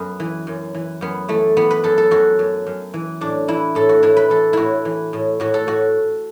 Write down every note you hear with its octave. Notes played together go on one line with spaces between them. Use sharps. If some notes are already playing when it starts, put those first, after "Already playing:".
Already playing: F#2 B3 A4
E3
F#2
E3
F#2 B3
E3 A3
E3 B3
B4
F#2 A4
A4
F#2 F#4
F#2
F#2
E3
A2 D4
E3 E4
A2 A4
F#4
A2 E4
B4
E3 A4
A2 E4 F#4
E3
A2
A2 F#4
A4
A2 F#4